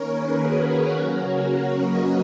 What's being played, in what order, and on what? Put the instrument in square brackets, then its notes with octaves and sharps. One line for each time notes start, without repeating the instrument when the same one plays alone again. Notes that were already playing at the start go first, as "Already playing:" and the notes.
Already playing: [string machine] D#3 A#3 C#4 A#4 C#5
G#4 B4
F#4 A#4
F#4 A#4
C#3 F#3 A#3 C#4
A#4 C#5
B4 D#5